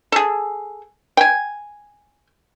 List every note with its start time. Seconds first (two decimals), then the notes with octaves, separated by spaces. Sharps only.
0.12 G#4 A4
1.17 G5 G#5